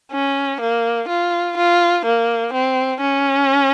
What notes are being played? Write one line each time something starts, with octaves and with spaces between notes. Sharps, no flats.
C#4
A#3
F4
F4
A#3
C4
C#4